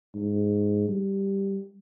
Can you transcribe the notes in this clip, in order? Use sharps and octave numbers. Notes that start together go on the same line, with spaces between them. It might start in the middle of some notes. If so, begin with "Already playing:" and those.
G#2
G3